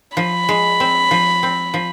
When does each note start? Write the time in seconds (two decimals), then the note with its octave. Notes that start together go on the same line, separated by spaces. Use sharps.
0.17 F3 B5
0.49 G#3
0.80 C4
1.11 F3
1.43 C4
1.74 F3